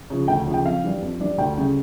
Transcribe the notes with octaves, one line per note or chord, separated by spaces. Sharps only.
C#3 F3
D2 G5
C#3 F3
G5
F2 F5
E3 G3 D4
F2
E3 G3 D4
D2 G5
C#3 G3 C#4 E4